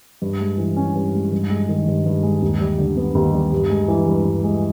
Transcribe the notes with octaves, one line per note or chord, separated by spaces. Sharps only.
G2
G#3
E3
C#4
G2
G#3
G2
G#3
D#3
G2
G2
G#3
D#2
G3
D3
B3
D#2
G3
G2
G#3
E3
G2
G2
G#3